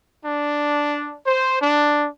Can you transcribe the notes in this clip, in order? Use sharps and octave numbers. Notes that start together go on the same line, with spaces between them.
D4
C5
D4